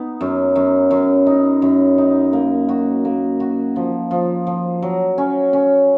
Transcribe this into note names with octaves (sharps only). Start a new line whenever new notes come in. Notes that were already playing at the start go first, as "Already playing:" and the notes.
Already playing: B3 D#4
F#2
F#2
F#2
D#4
F#2
D#4
A#3
F#4
A#3
F#4
F3
F3
F3
F#3
C#4
C#4